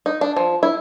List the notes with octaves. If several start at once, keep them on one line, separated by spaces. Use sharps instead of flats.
D#4
D4
F3
E4